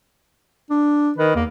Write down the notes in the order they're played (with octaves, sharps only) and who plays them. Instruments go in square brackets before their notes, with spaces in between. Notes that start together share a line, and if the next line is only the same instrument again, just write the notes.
[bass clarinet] D4
[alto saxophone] D#3 [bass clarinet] B4
[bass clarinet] E2 [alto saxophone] A#3